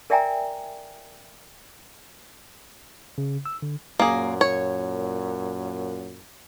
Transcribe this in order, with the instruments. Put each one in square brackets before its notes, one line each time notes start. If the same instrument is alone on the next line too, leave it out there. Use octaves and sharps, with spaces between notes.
[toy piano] A#4 D5 E5 G5 G#5 A#5
[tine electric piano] C#3
E6
D3
[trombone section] F#2 A#2 [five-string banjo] A#3 G#4
[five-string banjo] C#5